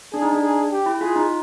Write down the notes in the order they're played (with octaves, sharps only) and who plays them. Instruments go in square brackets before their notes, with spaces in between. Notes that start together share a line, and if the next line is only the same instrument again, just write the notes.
[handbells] D4 [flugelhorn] G#4
[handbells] D#4
D4
[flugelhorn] G#4
G4
[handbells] E4
[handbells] F4 [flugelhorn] G#4
[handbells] D#4